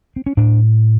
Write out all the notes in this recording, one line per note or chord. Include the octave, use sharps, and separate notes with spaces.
C4
C#4
A2 D4